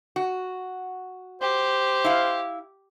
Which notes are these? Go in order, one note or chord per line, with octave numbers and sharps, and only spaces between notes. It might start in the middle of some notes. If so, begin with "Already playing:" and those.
F#4
G4 C5
E4 F5